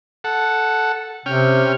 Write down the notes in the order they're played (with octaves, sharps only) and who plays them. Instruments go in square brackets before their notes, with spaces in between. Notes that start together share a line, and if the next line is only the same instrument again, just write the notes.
[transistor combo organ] A4 F#5
[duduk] C3 [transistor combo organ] C#4 G5 F6